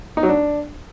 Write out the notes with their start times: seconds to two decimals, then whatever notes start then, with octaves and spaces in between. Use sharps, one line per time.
0.17 D#4
0.23 F#3
0.29 D4